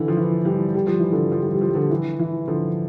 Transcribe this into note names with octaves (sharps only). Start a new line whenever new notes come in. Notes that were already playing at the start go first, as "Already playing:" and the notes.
Already playing: D3 E3
F3
E3
E3 G3
G3
F3
E3
D3 F3
F3
G3
F3
G3
F3
G3
D3 F3
E3
E3
D3 F3